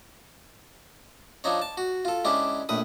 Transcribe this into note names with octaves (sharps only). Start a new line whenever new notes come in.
F3 D4 D#4 C#5
A5
F#4
F4 A4
G#3 C#4 D4 E4 G4
A#1 A2 B4 D#6